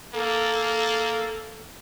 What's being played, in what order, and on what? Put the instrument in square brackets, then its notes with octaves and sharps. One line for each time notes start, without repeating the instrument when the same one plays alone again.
[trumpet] A#3 [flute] A4